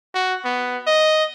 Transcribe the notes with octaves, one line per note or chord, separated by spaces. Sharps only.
F#4
B3
D#5